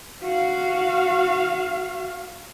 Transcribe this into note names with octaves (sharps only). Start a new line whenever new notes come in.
F#4 F5